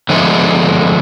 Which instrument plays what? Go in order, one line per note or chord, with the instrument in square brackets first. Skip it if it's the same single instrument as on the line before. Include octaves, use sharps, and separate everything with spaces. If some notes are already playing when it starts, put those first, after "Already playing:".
[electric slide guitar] D3 F3 G#3 A3 B3